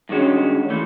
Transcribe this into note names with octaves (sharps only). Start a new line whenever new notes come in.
G2 D#3 G#3 C#4 F#4
E3 A3